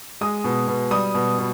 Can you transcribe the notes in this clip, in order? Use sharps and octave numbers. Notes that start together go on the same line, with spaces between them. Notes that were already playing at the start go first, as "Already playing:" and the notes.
G#3 D#6
B2
B2
G3 D#6
B2
B2